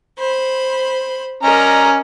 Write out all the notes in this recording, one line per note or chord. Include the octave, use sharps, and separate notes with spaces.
C5 B5
C#4 A#4 D5 D#5 A#5